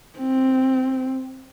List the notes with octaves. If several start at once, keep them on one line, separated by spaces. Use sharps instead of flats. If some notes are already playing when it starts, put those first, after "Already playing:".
C4